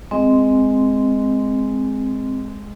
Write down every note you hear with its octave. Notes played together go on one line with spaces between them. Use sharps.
G#3 C4